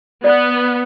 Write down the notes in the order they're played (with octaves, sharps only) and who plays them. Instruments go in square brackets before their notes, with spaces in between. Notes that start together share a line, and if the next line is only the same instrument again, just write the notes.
[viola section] B3 [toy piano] D5